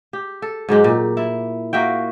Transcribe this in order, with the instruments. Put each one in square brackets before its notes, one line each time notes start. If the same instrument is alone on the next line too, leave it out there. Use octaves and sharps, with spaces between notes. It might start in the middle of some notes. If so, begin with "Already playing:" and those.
[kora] G4
A4
G#2 F#3 G#3 G4
A#2
E4
A#3 F#4 E5 G5